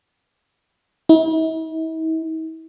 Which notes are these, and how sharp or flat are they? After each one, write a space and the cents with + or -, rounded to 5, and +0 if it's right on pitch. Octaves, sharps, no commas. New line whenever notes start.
E4 -45